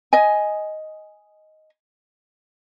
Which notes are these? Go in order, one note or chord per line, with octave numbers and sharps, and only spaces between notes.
D#5 G#5